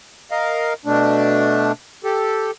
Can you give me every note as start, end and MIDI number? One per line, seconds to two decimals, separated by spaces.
0.31 0.73 70
0.31 0.73 75
0.31 0.73 77
0.85 1.72 47
0.85 1.72 57
0.85 1.72 62
2.04 2.51 67
2.04 2.51 69